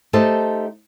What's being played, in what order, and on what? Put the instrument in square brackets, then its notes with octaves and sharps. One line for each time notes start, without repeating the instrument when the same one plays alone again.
[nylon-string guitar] A3 D#4 G4 A4 C5 A5